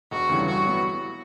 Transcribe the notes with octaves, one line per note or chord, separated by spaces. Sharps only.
E1 F#4
D2 C#3 E3 G3
G2 F#4
F#3 B3 E4